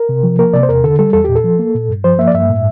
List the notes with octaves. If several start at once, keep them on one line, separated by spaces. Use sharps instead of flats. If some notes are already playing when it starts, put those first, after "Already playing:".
Already playing: A#4
C3
F3
A#3 A#4
C3 D5
C5
E2 A#4
D3 A4
G3 A4
E2 A4
A#2 G4
A4
F3
A#3
A#2
G2
F3 C5
A#3 E5
D5
G2 E5
A2